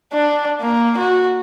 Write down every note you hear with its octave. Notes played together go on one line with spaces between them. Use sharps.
D4
A#3
F#4